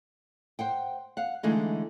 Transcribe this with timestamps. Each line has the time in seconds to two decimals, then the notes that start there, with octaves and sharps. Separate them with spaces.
0.59 C5 F#5 G5
1.17 F5 F#5
1.43 D3 E3 G#3 A3 D#4